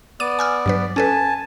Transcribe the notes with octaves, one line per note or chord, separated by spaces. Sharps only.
B3 D5 D6 D#7
G#5 E6 F6
G2 F#3 B4
C#4 A4 B4 G#5 A5